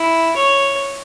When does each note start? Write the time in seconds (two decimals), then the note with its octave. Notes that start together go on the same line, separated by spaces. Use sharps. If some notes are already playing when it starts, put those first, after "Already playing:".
Already playing: E4
0.37 C#5